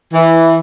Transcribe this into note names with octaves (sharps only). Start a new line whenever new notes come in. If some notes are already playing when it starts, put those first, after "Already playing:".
E3